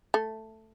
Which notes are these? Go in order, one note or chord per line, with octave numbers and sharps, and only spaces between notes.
A3